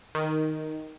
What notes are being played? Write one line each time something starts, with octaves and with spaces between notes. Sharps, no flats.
D#3